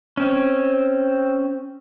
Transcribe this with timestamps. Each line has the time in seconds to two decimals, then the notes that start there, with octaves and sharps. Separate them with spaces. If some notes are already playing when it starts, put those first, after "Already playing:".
0.17 C4 C#4